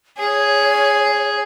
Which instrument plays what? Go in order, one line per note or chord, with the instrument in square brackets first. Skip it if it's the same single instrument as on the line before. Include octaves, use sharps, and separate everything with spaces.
[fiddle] G#4 [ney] C#5